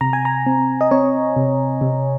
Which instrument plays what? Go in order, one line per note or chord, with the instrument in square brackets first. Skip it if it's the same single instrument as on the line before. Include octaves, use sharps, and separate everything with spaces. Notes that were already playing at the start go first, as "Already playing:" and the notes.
[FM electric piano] C3 A#5
G#5
A#5
C4
D#5
C4 C#5
C3
C3